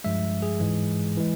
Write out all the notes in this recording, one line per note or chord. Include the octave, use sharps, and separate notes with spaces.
G2 F3 G#3 E5
G#4
G#2 E3 G#3
E3 G#3